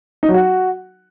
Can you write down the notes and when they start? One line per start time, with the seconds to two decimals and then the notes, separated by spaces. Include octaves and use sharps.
0.23 D#4
0.28 F#3
0.34 F#4